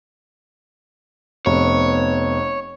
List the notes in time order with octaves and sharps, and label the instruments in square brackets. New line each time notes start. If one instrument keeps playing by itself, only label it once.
[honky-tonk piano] F1 [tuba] B3 [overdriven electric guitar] C#5